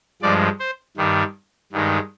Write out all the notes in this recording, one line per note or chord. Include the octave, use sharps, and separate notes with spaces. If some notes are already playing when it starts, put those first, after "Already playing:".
G2 F3 G#3 D5
C5
G2 D#3 G3
G2 D#3 G#3